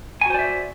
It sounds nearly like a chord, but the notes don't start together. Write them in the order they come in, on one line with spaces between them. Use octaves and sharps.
G#5 F#4 C5 D5 E5